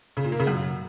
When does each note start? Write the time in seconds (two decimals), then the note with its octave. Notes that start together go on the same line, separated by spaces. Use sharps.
0.17 C#3
0.24 A#2
0.32 A#3
0.40 C#3
0.47 F#2